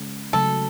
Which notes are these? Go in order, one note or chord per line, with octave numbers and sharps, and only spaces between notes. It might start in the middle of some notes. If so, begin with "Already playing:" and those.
Already playing: C#3 G#3 C#4
C#3 F#3 A3 A4